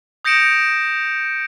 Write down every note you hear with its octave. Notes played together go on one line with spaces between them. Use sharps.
D#6 G6 A#6 C#7 D7 E7